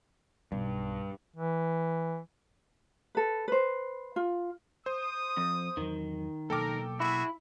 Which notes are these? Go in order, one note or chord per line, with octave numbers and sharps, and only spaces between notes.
B1 G2
E3
A4 B4
B4 C5
F4
C5 D#6
F2
E2 D#3 F#3
B2 F#3 A#3 A4 A#4 G5 D6
E4 F#4 G#4 E5